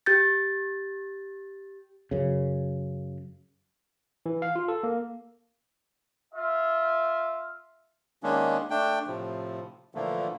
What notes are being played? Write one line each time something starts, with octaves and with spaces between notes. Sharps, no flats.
G4 G6 A6
F#2 C#3
E3
F5
F4
A4
A#3
F4 E5
D#3 G#3 A#3 C#4 D4
A3 D4 G5
A2 C3 F3
A#2 D3 E3 F3 A3 A#3